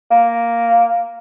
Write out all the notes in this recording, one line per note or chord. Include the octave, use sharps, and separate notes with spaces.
A#3